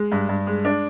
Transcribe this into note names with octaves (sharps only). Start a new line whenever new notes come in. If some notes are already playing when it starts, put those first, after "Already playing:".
Already playing: G#3
G2
G2
G#3
D4